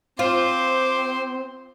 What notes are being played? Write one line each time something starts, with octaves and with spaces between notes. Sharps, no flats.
C4 F4 C5 D6